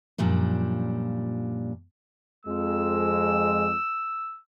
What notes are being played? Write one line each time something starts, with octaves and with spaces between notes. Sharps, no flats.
F#2 A#2 F3 G3 D4
F2 G#3 E6